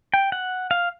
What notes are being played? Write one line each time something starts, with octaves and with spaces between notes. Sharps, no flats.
G5
F#5
F5